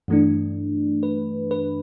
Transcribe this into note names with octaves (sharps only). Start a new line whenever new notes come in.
G2 E3 A3 D4
B4
B4